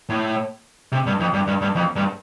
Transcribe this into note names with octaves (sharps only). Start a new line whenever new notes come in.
A2
C3
G2
F2
G2
G2
G2
F2
G2